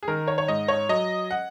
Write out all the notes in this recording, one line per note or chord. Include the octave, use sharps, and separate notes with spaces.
G#4
D#3 A#4
C#5
C#5
G#2 D#5
C#5
F#3 D#5
F#5